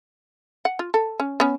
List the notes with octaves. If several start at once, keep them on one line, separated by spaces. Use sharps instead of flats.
F#5
F4
A4
C#4
B3 C#4